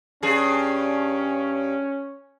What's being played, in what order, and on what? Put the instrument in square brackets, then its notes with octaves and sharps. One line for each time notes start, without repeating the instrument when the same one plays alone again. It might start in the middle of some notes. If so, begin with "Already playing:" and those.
[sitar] G2 G#4 [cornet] C#4